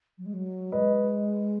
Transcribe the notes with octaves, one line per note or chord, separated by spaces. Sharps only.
F#3
G#3
F#3
G#3 B4 D#5